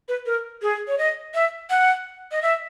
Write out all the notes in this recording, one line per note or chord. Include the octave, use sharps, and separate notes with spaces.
B4
A#4
G#4
C#5
D#5
E5
F#5
D#5
E5